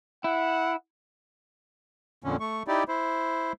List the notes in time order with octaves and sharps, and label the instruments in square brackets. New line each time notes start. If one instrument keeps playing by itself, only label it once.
[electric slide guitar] E4 [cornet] F#5
[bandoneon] F2 A#2 D3 C#4
A3 C#6
D#4 E4 G4 D5
E4 C5